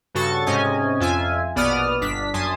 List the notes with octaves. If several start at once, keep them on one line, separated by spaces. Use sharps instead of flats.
G2 C#3 F#4 A4 C#6 A6
G#2 C3 C#4 D#5 G#5
F2 F4 E5 G#5
A#1 B2 B3 D5 D#6 F6
G1 D4 B6
F#2 G#5 A5 C6 D#6